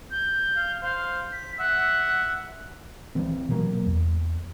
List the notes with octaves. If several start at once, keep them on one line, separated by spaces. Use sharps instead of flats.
G6
F5
C5 F5
B6
E5 F#5
E3 C4
B2 E3 F#3 A#3
E2